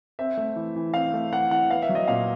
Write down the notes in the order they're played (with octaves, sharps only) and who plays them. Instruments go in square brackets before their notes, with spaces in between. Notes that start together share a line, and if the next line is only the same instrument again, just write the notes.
[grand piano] C4 E5
A3
E3
E3
C4 F5
A3
E3 F#5
E3 F#5
B3 F5
E5
F#3
D#5
A#2 F5